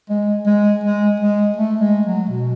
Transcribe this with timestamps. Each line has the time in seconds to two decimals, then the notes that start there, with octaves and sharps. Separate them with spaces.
0.10 G#3
0.47 G#3
0.84 G#3
1.20 G#3
1.57 A3
1.81 G#3
2.06 F#3
2.30 B2